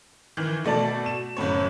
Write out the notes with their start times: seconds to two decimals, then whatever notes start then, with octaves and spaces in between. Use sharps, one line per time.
0.37 D#3 E3
0.64 B2 A3 D5 A5
1.06 E7
1.37 F#1 F#2 A2 C#5